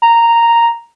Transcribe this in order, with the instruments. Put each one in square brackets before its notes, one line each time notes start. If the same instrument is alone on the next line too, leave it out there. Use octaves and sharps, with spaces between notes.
[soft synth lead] A#5